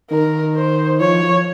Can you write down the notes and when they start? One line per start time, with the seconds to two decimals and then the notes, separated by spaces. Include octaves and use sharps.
0.11 D#3 A#4
0.56 C5
1.00 F3 C#5
1.23 F3